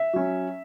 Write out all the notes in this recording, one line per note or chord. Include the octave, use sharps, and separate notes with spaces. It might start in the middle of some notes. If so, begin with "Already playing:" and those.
Already playing: E5
F#3 C#4